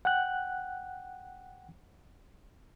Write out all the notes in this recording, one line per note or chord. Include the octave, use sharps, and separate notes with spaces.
F#5 G5 F#6